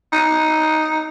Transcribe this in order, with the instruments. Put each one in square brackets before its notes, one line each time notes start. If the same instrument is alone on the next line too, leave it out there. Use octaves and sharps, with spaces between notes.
[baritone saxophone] D#4